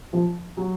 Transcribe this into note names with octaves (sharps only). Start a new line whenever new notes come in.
F3
F#3